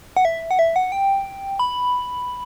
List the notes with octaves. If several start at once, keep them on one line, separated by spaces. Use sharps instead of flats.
F#5
E5
F#5
E5
F#5
G5
B5